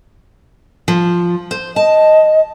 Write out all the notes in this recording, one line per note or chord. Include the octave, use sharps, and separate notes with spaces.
F3
C5
D#5 A5